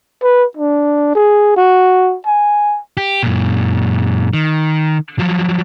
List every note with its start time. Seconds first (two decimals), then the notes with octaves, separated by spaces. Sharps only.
0.23 B4
0.57 D4
1.15 G#4
1.57 F#4
2.26 G#5
2.97 G4
3.23 F#2 A#2
4.33 D#3
5.19 F3 F#3